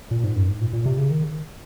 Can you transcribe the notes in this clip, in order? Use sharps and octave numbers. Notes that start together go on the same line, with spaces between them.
A#2
G#2
F#2
G#2
A#2
A#2
C3
C#3
D#3